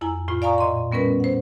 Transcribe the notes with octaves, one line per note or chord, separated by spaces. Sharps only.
F2 E4 G#5 A#5
A2 F4 B5
D5 F5 G#5 A#5 C#6 D#6
A#2 D#5 A#5 C6
G3 B3 C#4 A#4 B4
C5 F#5